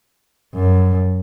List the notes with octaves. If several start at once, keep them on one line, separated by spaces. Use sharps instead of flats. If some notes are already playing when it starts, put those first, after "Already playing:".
F#2